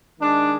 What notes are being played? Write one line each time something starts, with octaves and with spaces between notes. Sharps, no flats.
D#3 G#3 D4